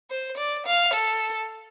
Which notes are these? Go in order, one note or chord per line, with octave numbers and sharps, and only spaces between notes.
C5
D5
F5
A4